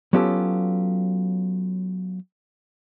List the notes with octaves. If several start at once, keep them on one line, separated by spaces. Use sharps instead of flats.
F#3 B3 C#4 F4 G4 A4